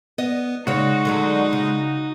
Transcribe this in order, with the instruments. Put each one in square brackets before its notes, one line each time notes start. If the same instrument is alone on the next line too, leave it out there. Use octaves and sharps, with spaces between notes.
[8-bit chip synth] B3 [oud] D#5
[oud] C#3 C#5 [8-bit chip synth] G#3 [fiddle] D#4 [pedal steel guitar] F#4
[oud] D3 F#3 A3
C#3